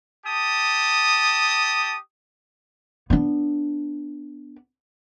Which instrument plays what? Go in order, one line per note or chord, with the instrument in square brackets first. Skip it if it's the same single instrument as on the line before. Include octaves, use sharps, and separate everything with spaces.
[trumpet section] G4 A5 D#6
[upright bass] B3 D4